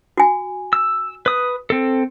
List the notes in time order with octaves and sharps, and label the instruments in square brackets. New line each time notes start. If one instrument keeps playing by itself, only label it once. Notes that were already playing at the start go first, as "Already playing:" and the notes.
[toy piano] F#4 G#5
[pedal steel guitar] E6
B4 D#6
C4 A4